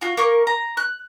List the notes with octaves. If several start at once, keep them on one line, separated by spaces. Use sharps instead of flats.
F4 F#4
A#3 A#4 C#6
A#5
F#6